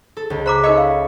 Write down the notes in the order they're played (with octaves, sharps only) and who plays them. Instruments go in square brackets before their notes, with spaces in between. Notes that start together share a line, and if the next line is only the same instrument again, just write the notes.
[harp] A4
C#2
[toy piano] C5 A#5 D6 [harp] B5 E6
[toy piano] D#4 A#4 D#5 [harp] C#5 E5 C#7
[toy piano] F5